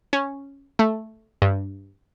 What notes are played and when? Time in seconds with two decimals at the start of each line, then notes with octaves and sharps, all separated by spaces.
0.13 C#4
0.79 A3
1.42 G2